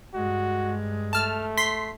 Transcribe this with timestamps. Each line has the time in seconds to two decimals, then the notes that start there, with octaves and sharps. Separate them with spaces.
0.14 G2 G#3 F#4
1.13 A3 A5 F6
1.57 C6 B6 C7